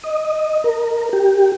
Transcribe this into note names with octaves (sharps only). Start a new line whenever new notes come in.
D#5
A#4
G4